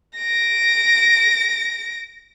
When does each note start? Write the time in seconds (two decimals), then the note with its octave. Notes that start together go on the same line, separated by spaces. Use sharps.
0.18 A#6 D7